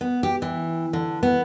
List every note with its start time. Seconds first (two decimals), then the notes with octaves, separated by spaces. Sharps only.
0.01 B3
0.23 G4
0.42 E3
0.93 D3
1.23 B3